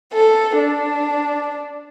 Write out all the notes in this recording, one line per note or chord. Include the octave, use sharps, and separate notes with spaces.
A4
D4